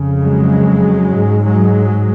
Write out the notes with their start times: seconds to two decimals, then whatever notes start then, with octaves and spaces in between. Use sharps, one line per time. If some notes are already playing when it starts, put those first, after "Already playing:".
Already playing: F2 C#3
0.21 F#3 G#3
1.15 G#2
1.45 F#3 G#3